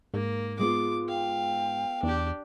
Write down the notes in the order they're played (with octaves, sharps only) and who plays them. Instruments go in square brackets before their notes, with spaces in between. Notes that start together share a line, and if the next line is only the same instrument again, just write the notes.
[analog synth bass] G#2 [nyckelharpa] A#3
[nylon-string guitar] G#3 B3 F4 [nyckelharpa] D6
[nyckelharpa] F5 [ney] G5
[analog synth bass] E2 [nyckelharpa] D4 G4